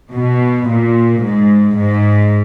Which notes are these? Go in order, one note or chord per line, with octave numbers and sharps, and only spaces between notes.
B2
A#2
G#2
G#2